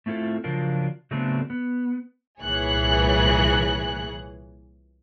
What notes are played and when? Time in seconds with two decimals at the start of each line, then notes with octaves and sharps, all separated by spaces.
0.06 A3 C4 E4 F4 A4
0.44 C#3 F3 F#3 D4 F4 A#4
1.11 C#3 F#3 A3 B3 C4 D4
1.50 B3
2.40 C2 A#2 E3 G#4 C#5 F#6